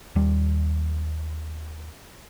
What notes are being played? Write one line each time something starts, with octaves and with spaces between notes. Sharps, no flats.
D#2 G3